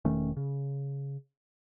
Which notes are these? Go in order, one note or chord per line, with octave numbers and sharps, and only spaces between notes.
E1 D#3 A3 C#4
C#3